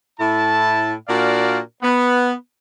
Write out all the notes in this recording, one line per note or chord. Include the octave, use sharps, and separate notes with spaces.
A2 E4 A5
A#2 D4 F#4 A#4 D5 F5
B3